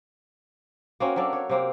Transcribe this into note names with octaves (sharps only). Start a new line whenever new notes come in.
A#3 C4 C#4 F#4
F#3 A#3 D4 A4
C#5
C3 A#3 C4